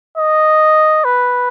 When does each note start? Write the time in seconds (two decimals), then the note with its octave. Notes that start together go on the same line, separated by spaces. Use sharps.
0.18 D#5
1.05 B4